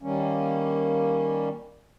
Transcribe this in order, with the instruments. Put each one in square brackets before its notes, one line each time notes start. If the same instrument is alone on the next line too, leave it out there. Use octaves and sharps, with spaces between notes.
[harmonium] D#3 G3 A#3 C#4